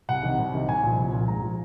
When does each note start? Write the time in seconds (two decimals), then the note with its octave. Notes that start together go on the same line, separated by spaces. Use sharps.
0.09 C2 F#5
0.23 C3 D#3
0.38 C2
0.54 C3 D#3
0.68 C2 G#5
0.83 A#2 F3
0.98 C2
1.13 A#2 F3
1.28 G#2 A#5
1.42 F3